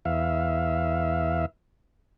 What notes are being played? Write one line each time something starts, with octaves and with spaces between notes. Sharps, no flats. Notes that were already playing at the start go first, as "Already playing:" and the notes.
E2 E5 F5